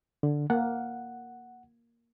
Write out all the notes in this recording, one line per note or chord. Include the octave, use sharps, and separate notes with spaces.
D3
A#3 F#5